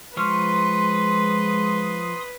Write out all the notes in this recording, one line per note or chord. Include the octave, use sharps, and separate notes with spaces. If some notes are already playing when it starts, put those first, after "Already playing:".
F3 G#3 B4 C6 C#6 D#6 F6